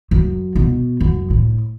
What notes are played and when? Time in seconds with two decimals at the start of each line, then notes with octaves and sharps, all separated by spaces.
0.11 F#2
0.55 B2
1.00 F#2
1.30 A2